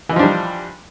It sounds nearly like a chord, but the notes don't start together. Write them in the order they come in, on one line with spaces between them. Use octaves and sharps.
E3 D#4 F3 D4 G3